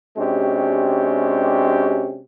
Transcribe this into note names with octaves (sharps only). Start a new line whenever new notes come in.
C3 G#3 C#4 D4 F#4 G4